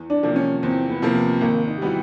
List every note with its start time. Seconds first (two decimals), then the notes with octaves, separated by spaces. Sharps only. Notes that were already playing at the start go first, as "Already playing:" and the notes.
Already playing: E2
0.10 D4
0.23 C3 F3 A#3
0.36 C#4
0.63 E2 C4
0.89 B3
1.02 C3 F3 A#3
1.15 B3
1.41 G#1 A#3
1.67 D#4
1.78 G4
1.81 E3 G3 B3 F#4